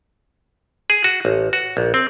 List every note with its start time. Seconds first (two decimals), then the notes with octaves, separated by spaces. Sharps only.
0.90 G#4
1.04 F#4
1.25 A1
1.53 F#4
1.77 A#1
1.94 C4